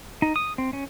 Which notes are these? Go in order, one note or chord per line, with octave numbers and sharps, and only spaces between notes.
D#4
D#6
C4
C#4